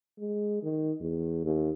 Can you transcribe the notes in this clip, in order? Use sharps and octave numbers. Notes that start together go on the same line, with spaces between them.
G#3
D#3
E2
D#2